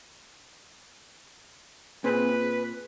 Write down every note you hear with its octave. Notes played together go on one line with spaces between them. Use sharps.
A#2 C4 G#4 B4